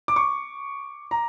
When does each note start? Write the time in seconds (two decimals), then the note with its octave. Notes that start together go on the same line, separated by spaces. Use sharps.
0.08 D6
0.16 C#6
1.11 A#5